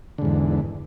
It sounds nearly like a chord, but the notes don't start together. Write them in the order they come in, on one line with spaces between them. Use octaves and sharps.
D3 G#2 E2